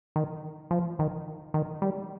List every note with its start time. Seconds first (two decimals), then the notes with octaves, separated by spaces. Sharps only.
0.16 D#3
0.71 F3
0.99 D#3
1.54 D#3
1.82 G3